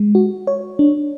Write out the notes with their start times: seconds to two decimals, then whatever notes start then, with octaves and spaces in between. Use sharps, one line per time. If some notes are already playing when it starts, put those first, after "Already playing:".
Already playing: G#3
0.15 F#4
0.47 C#5
0.79 D4